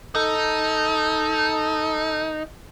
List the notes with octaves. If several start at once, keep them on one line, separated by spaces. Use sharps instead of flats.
D#4 A4